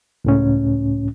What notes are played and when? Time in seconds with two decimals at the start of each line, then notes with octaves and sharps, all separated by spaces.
0.25 C#2 A2 C#4